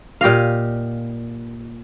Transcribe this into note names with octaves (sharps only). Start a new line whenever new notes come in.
A#2 G4 D#5 F5